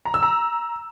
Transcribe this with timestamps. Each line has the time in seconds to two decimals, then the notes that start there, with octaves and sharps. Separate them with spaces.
0.05 A#5
0.14 E6
0.23 A#5